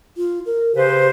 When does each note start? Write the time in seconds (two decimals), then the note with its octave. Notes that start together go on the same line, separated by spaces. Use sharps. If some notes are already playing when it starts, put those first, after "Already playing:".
0.17 F4
0.46 A#4
0.75 C#3 G4 B4 C5